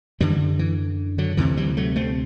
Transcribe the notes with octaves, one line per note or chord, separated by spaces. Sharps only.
F#2 D3 E3 G3
E3
D3 F#3
D2 C3 E3
E3 G3
F#3 A3
A3 C4